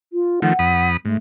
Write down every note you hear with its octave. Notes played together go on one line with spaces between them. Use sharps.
F4
D#3 F3 A3 F#5
F2 B5 D#6
G#2 A3